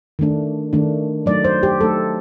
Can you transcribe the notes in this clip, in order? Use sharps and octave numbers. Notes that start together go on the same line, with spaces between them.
D#3 A3 D4
D#3 A3 D4
F#3 A3 D#4 D5
C5
G4
F#3 A3 D#4 A4